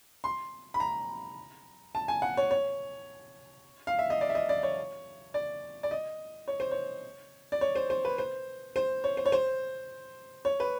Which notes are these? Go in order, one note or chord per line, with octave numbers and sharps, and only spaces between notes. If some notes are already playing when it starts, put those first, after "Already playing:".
C6
B5
A#5
A5
G#5
F#5
C#5
C#5
F5
E5
D#5
D5
E5
D#5
D5
C#5
D5
D5
D#5
C#5
C5
C#5
D5
C#5
C5
C5
B4
C5
C5
C#5
C5
C#5
C5
C#5
B4